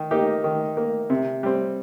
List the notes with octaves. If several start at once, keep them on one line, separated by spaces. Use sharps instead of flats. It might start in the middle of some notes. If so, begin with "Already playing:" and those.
Already playing: D#3
A#3 D#4 G4
D#3
A#3
C3
G3 C4